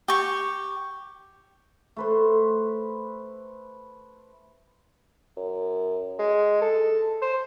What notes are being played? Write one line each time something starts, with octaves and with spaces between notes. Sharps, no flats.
G4 C#6
A3 B4 C5
F#2
G#3
A4
C5